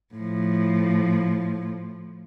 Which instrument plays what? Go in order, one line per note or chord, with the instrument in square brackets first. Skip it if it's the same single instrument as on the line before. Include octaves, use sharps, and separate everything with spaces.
[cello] A2 F3